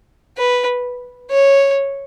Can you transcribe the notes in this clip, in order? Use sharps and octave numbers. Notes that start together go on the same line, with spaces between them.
B4
C#5